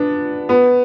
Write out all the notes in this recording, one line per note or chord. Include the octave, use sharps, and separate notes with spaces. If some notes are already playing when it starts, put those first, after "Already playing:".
Already playing: B3 D4
B3